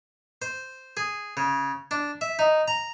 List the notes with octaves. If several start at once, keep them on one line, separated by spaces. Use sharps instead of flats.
C5
G#4
C#3
D4
E5
D#4
A#5